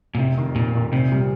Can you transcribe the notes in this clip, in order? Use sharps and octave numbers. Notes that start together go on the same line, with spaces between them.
A#2
F1 C3
F2 D#3
F1 A#2
F2 D#3
A#1 C3
A#2 G3